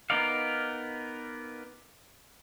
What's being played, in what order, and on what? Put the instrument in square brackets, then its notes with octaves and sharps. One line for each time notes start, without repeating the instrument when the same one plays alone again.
[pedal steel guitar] B3 D#4 A#4 D5 F5